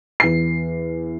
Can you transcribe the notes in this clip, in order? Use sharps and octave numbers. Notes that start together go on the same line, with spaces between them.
E2 C7